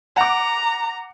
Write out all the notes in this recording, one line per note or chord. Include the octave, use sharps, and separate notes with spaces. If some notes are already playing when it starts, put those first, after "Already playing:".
F#5 A#5 D6